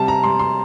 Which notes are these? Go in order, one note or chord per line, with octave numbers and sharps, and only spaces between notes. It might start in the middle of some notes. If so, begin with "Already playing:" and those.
Already playing: C3 G3 A5
A#5
G3 C6
C6